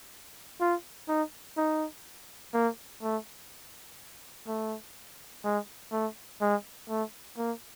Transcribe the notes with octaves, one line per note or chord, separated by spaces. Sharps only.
F4
D#4
D#4
A#3
A3
A3
G#3
A3
G#3
A3
A#3